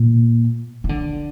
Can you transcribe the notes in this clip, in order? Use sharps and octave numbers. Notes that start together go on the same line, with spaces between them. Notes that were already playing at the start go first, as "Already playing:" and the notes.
Already playing: A#2
D#3
D3